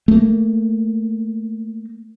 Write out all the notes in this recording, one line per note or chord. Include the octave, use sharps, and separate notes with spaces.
A3 A#3